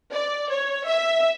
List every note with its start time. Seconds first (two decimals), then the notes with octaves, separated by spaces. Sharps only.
0.12 D5
0.49 C#5
0.86 E5